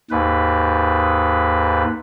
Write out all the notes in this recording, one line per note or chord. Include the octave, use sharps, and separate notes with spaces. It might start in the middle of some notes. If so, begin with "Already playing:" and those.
D#2 G#2 B4